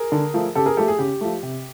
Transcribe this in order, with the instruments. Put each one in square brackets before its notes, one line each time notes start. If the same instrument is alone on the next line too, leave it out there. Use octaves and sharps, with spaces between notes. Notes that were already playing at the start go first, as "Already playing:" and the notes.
Already playing: [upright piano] G#4 A#4
D3
F3 A3
C#3 G4 A4
G#4 A#4
F3 A3 G4 A4
G#4
C#3 G4
F3 A3
C3